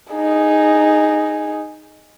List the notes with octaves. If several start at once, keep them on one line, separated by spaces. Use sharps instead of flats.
D#4 G#4